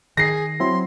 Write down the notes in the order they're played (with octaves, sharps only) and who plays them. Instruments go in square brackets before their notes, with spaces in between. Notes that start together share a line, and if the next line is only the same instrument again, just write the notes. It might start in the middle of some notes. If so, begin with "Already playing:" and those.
[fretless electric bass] D#3 [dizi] G#4 [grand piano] A#6 C7
[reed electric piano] F#3 C4 E4 [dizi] C6